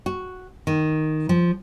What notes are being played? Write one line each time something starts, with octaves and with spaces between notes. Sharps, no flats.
F#4
D#3
F3